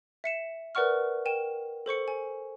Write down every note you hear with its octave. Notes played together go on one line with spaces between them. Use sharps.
E5 C#7 E7
A#4 B4 D5 F#5 C#6 F6
A#4 G5 D#7 E7
A4 C5 C#6 C#7
G#5